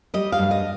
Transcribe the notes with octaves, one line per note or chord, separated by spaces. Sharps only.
G3 D#5
F5
G2
D#5